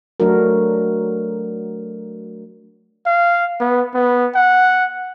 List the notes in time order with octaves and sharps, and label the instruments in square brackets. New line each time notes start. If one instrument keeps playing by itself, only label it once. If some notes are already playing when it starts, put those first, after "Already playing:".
[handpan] F#3 A3 D4 F#4 A#4
[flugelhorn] F5
B3
B3
F#5